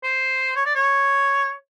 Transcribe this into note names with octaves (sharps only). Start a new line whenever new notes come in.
C5
C#5
D5
C#5